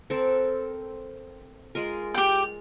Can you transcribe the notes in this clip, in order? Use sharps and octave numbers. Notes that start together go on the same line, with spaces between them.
C4 A4 A#4
G#3 F4 A#4
G4 G5